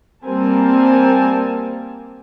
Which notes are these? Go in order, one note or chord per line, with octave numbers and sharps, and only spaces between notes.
G3 A#3 C4 A#4 G#5 A5